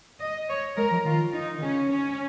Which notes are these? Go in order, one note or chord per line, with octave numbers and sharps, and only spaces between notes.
D#5
C#5
G#3 A#4
F3
D#3 F4
D#4
D#3
C#3 C#4
C#4